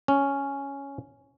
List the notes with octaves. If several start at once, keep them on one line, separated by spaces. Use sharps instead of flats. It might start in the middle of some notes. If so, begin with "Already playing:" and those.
C#4